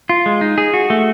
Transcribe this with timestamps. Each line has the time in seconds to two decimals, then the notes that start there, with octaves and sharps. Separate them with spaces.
0.09 F4
0.26 G#3
0.41 D#4
0.58 G#4
0.74 F#4
0.90 A3